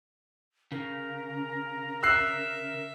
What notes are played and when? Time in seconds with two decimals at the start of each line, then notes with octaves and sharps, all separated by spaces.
0.72 C#3 A#4
2.03 E5 E6 F#6 C7